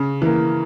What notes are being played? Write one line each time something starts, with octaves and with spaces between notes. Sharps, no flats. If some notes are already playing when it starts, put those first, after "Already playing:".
Already playing: C#3
E3 A#3